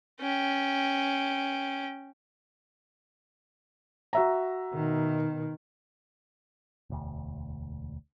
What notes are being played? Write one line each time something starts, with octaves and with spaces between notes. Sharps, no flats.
C#4 G5
F#4 E5 A#5
B2 D#3
E1 D2